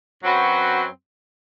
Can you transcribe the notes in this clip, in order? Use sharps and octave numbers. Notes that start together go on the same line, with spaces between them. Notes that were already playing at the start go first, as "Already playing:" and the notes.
F#2 F#3 C4 F#4 B4